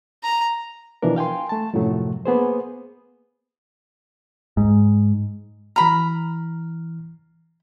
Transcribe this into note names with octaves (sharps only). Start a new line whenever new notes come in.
A#5
B2 E3 F3 D4 A#4
F5 G5 G#5 C6
A3 A5
F#2 A2 C3 F3 F#3 A3
A#3 B3 G#4 C5
G#2
E3 A#5 B5 F6